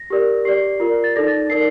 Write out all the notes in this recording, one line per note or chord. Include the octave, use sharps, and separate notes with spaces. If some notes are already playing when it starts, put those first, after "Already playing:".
Already playing: A#6
G4 A#4 D5
G4 D5 C7
F4 A#4 D5
A6
D#4 A4 D5 A#6
A6
D#4 A#4 D5 C7